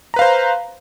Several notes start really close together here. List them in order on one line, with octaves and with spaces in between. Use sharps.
A#5 B4 F5 C5